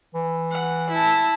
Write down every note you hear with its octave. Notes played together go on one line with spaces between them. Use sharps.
E3
F#5
E4 A5